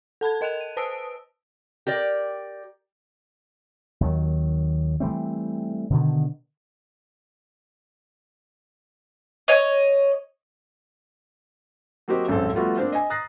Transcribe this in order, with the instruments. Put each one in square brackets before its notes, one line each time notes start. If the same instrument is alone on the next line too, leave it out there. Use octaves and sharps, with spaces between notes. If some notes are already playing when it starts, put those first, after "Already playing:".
[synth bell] A4 A5 B5 G#6
A#4 D#5 F#6 E7 F7
D#7
B4 C5 A5 D#6 E6 D7
[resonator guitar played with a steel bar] G4 A#4 D5
[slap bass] D#2 D#3 F#3
E3 G3 A3 C4
B2 D3 D#3
[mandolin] C#5 D#5
[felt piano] F#3 A#3 C4 F#4 G4 D#5
D#1 A1 F#2 G#3 C4 A4
F3 G3 A3 B3 F4 F#4
A#3 C4 D4 C5 F5
D#5 G#5
A#5 D#6 F#6 A6 A#6 C7